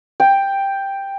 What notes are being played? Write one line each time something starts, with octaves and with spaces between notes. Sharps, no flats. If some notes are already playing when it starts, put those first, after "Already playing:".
G5